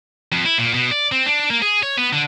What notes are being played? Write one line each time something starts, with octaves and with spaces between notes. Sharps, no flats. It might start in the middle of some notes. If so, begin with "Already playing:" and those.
F2
E4
A#2
B2
D5
C4
D4
A#3
G#4
C#5
B3
D3